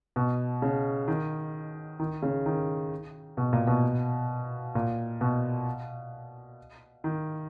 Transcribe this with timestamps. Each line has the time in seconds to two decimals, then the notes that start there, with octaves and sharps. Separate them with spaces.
0.16 B2
0.62 C#3
1.08 D#3
2.00 D#3
2.22 C#3
2.46 D#3
3.37 B2
3.53 A#2
3.67 B2
4.75 A#2
5.21 B2
7.04 D#3